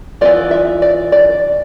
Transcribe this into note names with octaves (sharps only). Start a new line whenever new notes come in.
E3 B3 F4 D5
E5
D5
D5